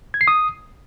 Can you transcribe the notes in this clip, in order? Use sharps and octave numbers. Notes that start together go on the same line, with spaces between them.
G#6
C7
D#6